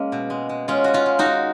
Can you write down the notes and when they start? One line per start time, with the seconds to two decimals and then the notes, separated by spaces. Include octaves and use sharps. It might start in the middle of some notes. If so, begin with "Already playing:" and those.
Already playing: G#3 A#3 C#4
0.12 B2
0.30 G#3
0.49 G#3
0.68 G#3 C#4 F4
0.84 G#3 F#4
0.94 C#4 F4
1.06 G#3
1.19 D#4 F#4
1.26 G#3